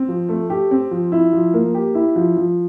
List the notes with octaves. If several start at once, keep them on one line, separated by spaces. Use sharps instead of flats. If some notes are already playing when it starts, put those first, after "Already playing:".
Already playing: C4
F3
A3
G4
C4
F3
E4
F3
A#3
G4
E4
F3
F3